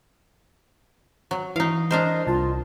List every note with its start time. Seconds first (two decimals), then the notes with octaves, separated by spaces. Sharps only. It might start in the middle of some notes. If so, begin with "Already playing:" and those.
1.31 F#3
1.56 E3 D#4 F5
1.91 D4 A#4 C5 D#5
2.27 C2 F4 A5